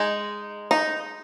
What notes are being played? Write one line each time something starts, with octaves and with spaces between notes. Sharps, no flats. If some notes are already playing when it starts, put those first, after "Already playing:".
Already playing: G#3 D#4
D#4